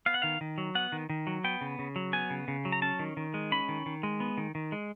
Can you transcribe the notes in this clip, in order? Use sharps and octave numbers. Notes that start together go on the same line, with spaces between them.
B3 F5
F#5
D#3 F5
D#3
F#3
B3 F#5
D#3
D#3
F#3
B3 G5
C#3
C#3
F#3
B3 G#5
C#3
C#3
F#3
A#5
C#4 A5
D#3
D#3
G#3
C#4 B5
D#3
D#3
G#3
B3
D#3
D#3
G#3